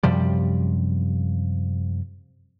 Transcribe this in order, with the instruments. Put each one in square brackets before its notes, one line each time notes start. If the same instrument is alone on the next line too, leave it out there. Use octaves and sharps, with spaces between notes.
[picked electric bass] F#2 C3 F3 G3